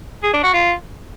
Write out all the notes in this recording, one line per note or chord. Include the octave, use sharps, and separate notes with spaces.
G#4
D4
F#4
F4